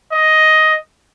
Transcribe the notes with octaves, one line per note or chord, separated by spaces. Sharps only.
D#5